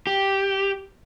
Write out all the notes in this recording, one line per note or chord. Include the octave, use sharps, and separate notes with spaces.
G4